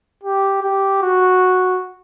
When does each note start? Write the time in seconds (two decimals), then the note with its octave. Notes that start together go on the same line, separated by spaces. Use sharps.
0.23 G4
0.62 G4
1.02 F#4